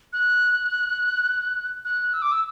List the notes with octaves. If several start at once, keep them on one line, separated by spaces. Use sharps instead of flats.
F#6
F#6
E6
D6
E6